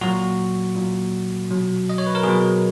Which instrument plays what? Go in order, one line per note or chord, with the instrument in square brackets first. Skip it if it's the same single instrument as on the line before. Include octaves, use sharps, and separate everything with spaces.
[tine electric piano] A#2 F#3 F#4
A#2 F#3
B2 F#3
D#5
C#5
B4
A#4
B2 F#3 G#4